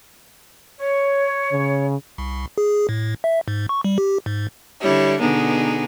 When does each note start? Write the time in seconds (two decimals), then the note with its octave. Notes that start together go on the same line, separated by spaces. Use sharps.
0.79 C#5
1.52 C#3
2.18 C2
2.58 G#4
2.89 A2
3.24 E5
3.48 G#2
3.69 C#6
3.84 G3
3.98 G4
4.26 G#2
4.82 D3 G3 E4 C#5
5.20 B2 D3 B3 D#4 G#4